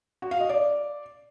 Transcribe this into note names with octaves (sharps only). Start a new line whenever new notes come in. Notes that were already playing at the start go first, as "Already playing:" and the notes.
F#4
F5
D#5
D5